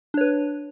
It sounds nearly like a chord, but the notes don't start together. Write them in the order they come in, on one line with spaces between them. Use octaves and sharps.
D4 C#5 B4